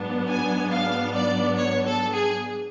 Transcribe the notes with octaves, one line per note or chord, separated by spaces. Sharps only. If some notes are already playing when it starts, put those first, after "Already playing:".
Already playing: G#2 F#3 B3 D4
G#5
F5
D5
C#5
A4
G#4